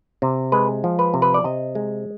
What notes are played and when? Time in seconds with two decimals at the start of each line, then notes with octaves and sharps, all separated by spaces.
0.22 C3
0.52 G#3 B4
0.84 F3
0.99 B4
1.14 C3
1.22 B4
1.34 D5
1.44 C3 D#5
1.75 G#3